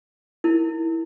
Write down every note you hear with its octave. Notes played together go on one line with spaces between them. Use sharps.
D#4 E4 A#4